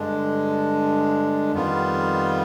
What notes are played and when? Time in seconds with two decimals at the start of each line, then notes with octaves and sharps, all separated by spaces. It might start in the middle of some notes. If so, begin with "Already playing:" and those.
Already playing: G2 D3 G#3 D4
1.52 F2 D#3 G3 B3 F4